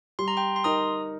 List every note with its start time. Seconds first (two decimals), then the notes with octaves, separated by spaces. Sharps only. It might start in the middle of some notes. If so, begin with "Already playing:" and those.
0.19 G3 C6
0.28 A#5
0.37 G5 C6
0.56 C6
0.64 D#4 A#4 A#5 D#6